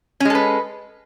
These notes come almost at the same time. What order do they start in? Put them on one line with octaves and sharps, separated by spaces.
C#4 G#3 A4 B4